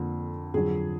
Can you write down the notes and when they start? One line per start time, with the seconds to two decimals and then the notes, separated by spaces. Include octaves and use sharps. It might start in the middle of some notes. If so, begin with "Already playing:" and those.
Already playing: F2 D3 A#3
0.54 F2 D3 F#3 G#4